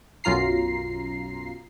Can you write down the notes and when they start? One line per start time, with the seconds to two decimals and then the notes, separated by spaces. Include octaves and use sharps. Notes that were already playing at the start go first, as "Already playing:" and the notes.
0.24 B1 F#2 F4 A#5 C7